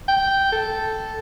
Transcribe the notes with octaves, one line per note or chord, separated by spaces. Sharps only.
G5
A4